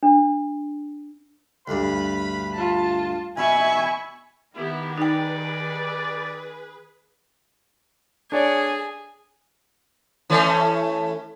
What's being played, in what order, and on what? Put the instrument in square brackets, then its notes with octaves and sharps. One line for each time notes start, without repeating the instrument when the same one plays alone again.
[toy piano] D4
[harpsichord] D2 G2 [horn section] B4 F5 B5
[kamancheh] F4 A5
[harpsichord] B2 [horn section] E5 [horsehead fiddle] G#5 [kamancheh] B5 C#6
[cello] D#3 [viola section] B3 G4 [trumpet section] E4
[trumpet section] G3 D5 [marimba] D#4 G5 [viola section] G#4 B4
[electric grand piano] D4 C#5 D5 [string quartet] G#4
[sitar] E3 A3 C#4